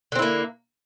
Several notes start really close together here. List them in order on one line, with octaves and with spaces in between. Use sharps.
D3 C4 E4 A#3